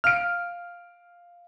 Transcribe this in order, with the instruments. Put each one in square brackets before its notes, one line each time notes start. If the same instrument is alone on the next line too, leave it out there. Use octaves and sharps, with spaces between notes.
[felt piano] F5 D7 [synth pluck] F6